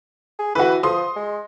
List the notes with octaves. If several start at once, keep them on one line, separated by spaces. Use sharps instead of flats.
G#4
E3 F#4 B4
F3 C6 D#6
G#3